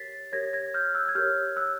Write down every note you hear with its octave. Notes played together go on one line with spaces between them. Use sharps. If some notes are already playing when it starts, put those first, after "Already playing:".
Already playing: G4 A#4 C#5 A6 B6 C7
G4 A#4 C#5 G#6 A#6
G#6 A#6
F6 G6
E6 F#6
G#6
G4 A#4 C#5 F6 G6
E6 F#6